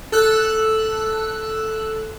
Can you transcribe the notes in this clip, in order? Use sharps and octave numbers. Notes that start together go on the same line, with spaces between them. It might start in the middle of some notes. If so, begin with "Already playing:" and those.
A4 E6 F#6